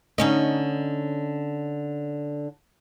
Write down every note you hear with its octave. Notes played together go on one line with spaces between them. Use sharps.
D3 C#4 D#4